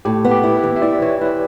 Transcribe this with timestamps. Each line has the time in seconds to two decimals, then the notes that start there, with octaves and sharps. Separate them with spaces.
0.05 A2 G4
0.24 B3
0.31 G4
0.44 E4
0.57 B4
0.63 E3
0.76 E5
0.82 E4 D5
1.02 E3 C#5
1.21 E4 B4